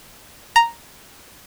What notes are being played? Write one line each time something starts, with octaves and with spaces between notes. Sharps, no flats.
A#5